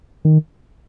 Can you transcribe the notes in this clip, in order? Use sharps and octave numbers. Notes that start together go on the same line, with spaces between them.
D#3